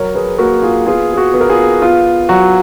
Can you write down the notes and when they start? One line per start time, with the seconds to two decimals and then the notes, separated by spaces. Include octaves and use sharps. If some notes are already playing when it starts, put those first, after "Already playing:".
Already playing: F#3 A#4 C#5
0.15 G#4 B4
0.38 A#3 F#4 A#4
0.62 F4 G#4
0.86 B3 F4 G#4
1.13 G#4
1.17 F#4
1.34 B3
1.41 A#4
1.50 F4 G#4
1.82 B3 F4
2.29 F#3 F#4